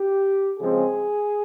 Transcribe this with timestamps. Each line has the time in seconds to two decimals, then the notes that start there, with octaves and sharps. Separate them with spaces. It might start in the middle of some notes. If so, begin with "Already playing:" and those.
Already playing: G4
0.59 C#3 F3 G#3 C4 G#4